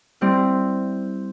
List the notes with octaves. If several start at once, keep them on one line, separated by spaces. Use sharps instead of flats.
G3 C4 E4